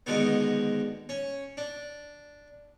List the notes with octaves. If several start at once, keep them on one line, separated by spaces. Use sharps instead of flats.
G#2 B2 D3 D#3 B3
C#4
D4